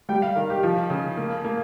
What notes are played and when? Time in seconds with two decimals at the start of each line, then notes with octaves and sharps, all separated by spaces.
0.09 G3 G5
0.22 F5
0.35 D#3 A#4
0.50 G4
0.63 F3
0.90 C#3
1.17 A#3
1.44 A#3